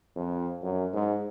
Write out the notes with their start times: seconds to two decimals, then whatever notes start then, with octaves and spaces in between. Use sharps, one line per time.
0.16 F2
0.62 F#2
0.93 G#2